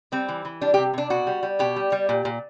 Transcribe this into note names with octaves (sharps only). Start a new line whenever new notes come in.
G3 C4
E3
E3
G3 D4
C3 G4
C3 D4
B2 F#4
G3
G3
B2 G4
G3
G3
A#2
A#2